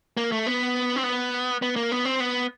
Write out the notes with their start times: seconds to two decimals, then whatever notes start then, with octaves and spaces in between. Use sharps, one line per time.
0.17 A#3
0.32 A3
0.47 B3
0.96 C4
1.04 B3
1.62 B3
1.76 A#3
1.92 B3
2.05 C4
2.20 B3